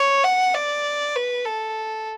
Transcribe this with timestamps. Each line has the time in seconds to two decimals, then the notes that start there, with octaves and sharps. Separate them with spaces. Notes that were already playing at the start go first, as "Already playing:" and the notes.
Already playing: C#5
0.24 F#5
0.54 D5
1.15 B4
1.45 A4